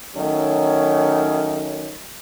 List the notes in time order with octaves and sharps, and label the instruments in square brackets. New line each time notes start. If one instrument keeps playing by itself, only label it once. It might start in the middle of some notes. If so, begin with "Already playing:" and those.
[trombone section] D#3 F#3 A3 C#4